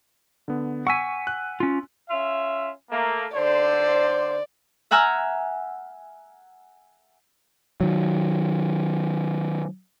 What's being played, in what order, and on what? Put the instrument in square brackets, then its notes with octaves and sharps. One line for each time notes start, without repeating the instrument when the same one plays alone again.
[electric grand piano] D3 B3
[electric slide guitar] F#5 G#5 [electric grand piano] C#6 E6 B6
[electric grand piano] F#6
[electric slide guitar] C#4 F4
[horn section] C#4 F4 E5
A3 A#3
[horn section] D3 C5 [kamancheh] D5
[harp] E5 F#5 G#5 A#5 E6 F6
[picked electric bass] D#3 F#3